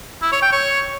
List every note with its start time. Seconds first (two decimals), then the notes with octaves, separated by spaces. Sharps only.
0.22 E4
0.32 C#5
0.42 G5
0.52 C#5